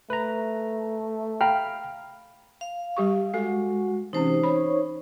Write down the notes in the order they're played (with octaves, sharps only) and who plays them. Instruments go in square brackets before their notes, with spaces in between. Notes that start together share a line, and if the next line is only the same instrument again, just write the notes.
[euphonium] A3 [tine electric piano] B4 A#5
[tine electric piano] F5 B5 F6 [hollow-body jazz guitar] G5 A#5
[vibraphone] F5
[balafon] G3 G4 C#6
[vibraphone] G#3 [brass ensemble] F#4 [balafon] A4 F5
[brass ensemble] C3 [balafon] E3 C4 C#4 [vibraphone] D#4 C5
[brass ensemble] C#5 [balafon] B5